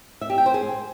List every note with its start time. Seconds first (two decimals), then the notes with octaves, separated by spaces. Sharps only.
0.21 E5
0.30 G4
0.38 G5
0.46 C5
0.54 G#4